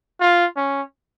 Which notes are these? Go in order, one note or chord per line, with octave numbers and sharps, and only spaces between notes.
F4
C#4